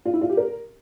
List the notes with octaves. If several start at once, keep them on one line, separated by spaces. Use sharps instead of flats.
F4
E4
F4
G4
A#4